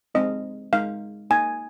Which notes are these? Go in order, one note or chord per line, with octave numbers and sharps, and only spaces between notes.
G#3 C4 D#4 D#5
G#3 D#4 F5
A#3 D#4 G#5